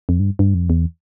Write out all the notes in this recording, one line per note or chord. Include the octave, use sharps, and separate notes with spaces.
F2
G2
G2
F2
E2